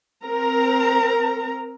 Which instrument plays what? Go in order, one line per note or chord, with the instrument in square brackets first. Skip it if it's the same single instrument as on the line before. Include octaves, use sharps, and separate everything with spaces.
[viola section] C4 A#4 A#5